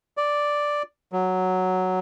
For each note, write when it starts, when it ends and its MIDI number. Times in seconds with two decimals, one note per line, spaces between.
0.17 0.83 74
1.12 2.00 54